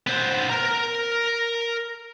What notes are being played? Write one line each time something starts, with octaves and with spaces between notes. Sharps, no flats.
B3 C5
A#4 A#5